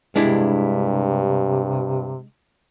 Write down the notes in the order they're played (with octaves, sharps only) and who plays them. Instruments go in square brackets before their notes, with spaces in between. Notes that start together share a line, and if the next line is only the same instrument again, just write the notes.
[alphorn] G2 [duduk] C3 [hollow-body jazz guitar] G#3 D4 E4